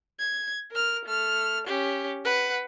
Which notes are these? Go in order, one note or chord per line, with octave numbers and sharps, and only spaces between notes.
G#6
A#4 F6
A3 F6
C#4 G4
B4 F#5